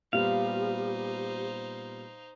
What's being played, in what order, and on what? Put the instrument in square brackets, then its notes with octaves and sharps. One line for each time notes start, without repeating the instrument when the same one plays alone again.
[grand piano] A#2 G3 B3 [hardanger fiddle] D#4 C5 [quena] G4 [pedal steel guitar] F5